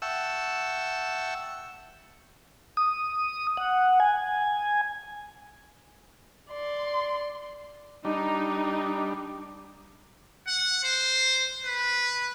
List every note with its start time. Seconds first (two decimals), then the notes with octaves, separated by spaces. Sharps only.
0.02 E5 F#5 G5 A5 C#6 E6
2.77 D#6
3.57 F#5
4.00 G#5
6.50 D5 C6
8.05 G3 D4 D#4
10.47 F#5
10.84 C5
11.64 B4